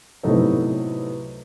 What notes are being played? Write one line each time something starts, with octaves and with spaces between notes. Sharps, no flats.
A2 C3 F#3 B3 D#4 A4